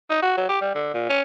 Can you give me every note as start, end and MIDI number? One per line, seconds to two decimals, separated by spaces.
0.10 0.20 63
0.23 0.33 66
0.38 0.46 54
0.49 0.58 67
0.61 0.70 55
0.75 0.90 50
0.94 1.09 46
1.09 1.21 61